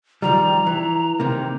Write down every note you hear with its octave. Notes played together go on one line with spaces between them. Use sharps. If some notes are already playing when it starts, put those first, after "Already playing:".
D#3 F3 G3 A#5
E3
C3 D#3 A#3